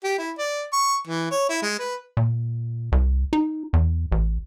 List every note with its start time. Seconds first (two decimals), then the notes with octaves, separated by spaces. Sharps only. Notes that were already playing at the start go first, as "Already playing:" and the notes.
0.04 G4
0.18 E4
0.38 D5
0.73 C#6
1.07 E3
1.31 C#5
1.49 E4
1.62 G#3
1.79 B4
2.17 A#2
2.92 C2
3.33 D#4
3.73 E2
4.12 A1